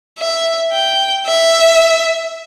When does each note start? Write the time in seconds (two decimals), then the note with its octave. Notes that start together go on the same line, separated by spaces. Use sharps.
0.18 E5
0.73 G5
1.27 E5